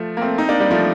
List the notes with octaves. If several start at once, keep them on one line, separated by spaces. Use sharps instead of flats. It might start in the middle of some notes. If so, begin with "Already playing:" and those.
Already playing: F3 A3
A#3
A3 C4
C4 D#4
A#3 D4
G3
F3 A3